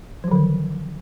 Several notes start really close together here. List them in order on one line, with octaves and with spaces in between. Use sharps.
F3 F#3 D3 D#3